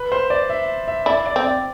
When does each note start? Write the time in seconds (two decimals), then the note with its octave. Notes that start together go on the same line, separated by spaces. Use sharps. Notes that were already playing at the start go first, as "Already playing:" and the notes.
Already playing: B4
0.12 C5
0.30 D5
0.50 E5
0.88 E5
1.06 E4 D5
1.26 D5
1.36 C4
1.45 D5